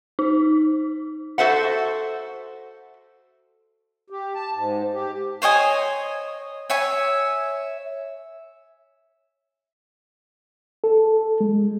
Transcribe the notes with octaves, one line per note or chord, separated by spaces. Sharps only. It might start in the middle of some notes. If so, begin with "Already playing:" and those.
D#4
F#4 A4 C5 E5 F#5
G4
A5
G#2
G4
C5 C#5 D#5 G#5
C#5 E5 G#5
A4
G#3